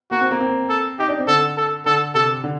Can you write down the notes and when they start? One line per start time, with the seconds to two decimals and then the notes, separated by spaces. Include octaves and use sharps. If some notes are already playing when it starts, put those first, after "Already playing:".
0.11 A#3 F#4
0.21 C4
0.31 A#3
0.40 C4
0.70 A4
0.99 D#4 G4
1.08 D4
1.18 C4
1.28 D3 A4
1.57 A4
1.86 D3 A4
2.15 C3 A4
2.44 D3